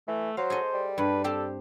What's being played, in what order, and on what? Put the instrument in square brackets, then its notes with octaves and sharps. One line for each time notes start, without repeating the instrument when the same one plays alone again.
[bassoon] E3 [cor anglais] A3
[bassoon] F#3 [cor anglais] C5 [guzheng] F5
[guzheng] G#4 A4 D#5
[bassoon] G3
[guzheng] G2 [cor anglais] B4
[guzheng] C4 G4 C5 [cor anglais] A4